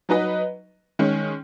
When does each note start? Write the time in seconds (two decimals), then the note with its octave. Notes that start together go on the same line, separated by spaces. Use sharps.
0.09 F#3 D#4 B4 D#5
0.99 D#3 G#3 C#4